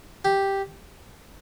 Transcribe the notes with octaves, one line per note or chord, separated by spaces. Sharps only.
G4